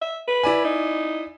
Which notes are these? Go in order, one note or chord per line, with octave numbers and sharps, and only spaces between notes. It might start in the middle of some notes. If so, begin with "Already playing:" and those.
E5
B4
E4 D5 G#5
D#4